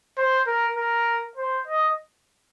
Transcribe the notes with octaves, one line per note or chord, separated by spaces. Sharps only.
C5
A#4
A#4
C5
D#5